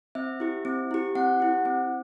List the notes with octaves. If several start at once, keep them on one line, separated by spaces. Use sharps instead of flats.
C4 E5
E4 G4
C4
E4 G4
C4 F#5
E4 G4
C4